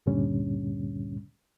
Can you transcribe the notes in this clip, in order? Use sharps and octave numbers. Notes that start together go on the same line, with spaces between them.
D2 G2 A#2 D3 G3 C#4